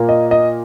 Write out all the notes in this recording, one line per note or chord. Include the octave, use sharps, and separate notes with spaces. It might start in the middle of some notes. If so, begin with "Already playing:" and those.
Already playing: A#2 A#3
D#5
D#5